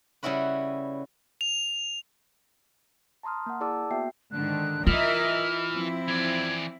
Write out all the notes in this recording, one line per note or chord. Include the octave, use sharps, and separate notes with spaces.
C#3 G3 C#4 E4 F#4 B4
F7
A5 A#5 C6 D#6 F6
A#3 F#5
E4 G#4 D5 A5 D6 E6
A#3 B3 F#4 E5 G5 C7
G#2 D3 D#3 F#6
E3 F4 A#4 D#5 E5 F6
F3 C4 E4
E3 D5 G#6